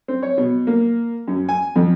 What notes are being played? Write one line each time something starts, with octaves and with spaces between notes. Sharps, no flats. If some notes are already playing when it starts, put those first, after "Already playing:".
C4
C#5
B2
A#3
F#2
G#5
F2